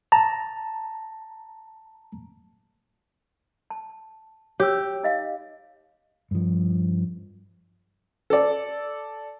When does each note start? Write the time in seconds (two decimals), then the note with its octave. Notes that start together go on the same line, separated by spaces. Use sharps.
0.12 A5 A#5
3.70 A5
4.60 G4 C#5 E6
5.03 D#4 D#5 F5
6.31 G2 F3
8.30 A4 D5